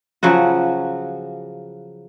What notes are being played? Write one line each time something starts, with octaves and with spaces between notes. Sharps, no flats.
C#3 F3 F#3 F#4